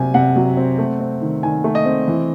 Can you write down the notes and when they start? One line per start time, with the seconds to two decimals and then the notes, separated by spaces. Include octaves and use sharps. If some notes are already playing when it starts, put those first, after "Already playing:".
Already playing: C3 F#3 C4 G#5
0.14 C3 F#5
0.36 F#3
0.57 C4
0.78 A3
1.00 C4
1.21 D#3
1.43 D#3 G#5
1.64 A3
1.75 D#5
1.85 C4
2.08 E3